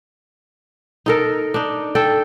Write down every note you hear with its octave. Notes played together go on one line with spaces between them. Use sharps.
D#4 A4 A#4
D4 D#4
A4 G5